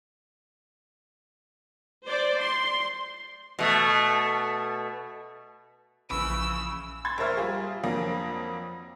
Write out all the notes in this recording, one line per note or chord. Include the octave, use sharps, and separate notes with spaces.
C5 D5
C6
B2 A3
A#1 C#3 E3 B5 C#6 E6 D7
B5 C6 G#6 A6
A#1 A#4 C5 E5 F6
G3 F4 G#4
F2 F#3 A#3 D4 A#6